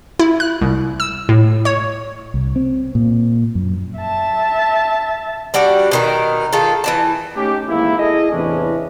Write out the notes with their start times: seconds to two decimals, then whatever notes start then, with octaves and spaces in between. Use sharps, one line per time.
0.19 E4
0.40 F#6
0.61 C2
1.00 E6
1.29 A2
1.65 C#5
2.34 C2
2.56 C4
2.95 A#2
3.55 F#2
4.00 E5 A5
5.54 G3 D4 F#4 D5
5.91 B2 D#3 A#4
6.53 D#3 G#3 F4 A4
6.84 E3 D4 A5
7.36 A3 C#4 D#4 G4
7.68 G#1 E2 A#3 E4
7.98 E4 G#4 A4 D#5
8.32 E2 A2 C3 E3 C#4 D4